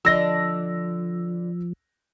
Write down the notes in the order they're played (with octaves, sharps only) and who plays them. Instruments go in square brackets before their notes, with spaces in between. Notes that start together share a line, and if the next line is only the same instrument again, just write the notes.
[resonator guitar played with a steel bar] D3 D4 D#5 [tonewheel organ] F3 [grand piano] E6 A#6